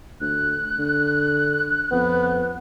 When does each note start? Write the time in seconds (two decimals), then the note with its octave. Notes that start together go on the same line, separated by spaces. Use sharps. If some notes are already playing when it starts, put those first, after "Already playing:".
0.21 D2 F#6
0.79 D3
1.92 F2 B3